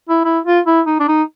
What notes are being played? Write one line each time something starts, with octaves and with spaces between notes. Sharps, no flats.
E4
E4
F4
E4
D#4
D4
D#4